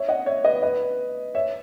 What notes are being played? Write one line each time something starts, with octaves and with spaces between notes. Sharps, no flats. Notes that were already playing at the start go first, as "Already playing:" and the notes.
Already playing: C#5 E5
D#5 F#5
C#5 E5
B4 D#5
B4 D#5
C#5 E5